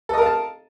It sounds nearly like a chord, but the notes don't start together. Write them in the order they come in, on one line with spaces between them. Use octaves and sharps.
A4 D#5 A#4 F5 A5